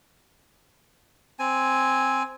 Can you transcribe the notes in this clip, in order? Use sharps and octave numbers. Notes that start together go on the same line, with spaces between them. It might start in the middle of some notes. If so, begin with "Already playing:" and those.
C4 G#5